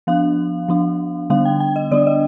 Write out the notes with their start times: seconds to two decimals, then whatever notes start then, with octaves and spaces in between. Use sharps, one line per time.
0.07 F3 B3 D4 F5
0.68 F3 B3 D4
1.30 D3 G3 B3 D4 F5
1.45 G5
1.60 G5
1.76 D#5
1.91 D3 G3 B3 D4 D5
2.07 D#5